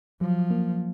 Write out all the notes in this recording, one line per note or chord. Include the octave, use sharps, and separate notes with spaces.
F3 F#3
A#3